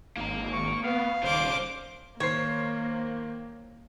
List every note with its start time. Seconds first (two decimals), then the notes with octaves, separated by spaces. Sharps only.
0.17 G#1 A#3 A#5
0.52 C#6
0.82 B3 F5
1.23 D#1 C#3 C5 D5 D6
2.20 D#3 A#3 C5 C#5 C7